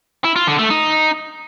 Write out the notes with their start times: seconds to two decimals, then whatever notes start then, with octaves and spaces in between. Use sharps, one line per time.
0.24 E4
0.36 F4
0.47 D3
0.59 A3
0.70 D#4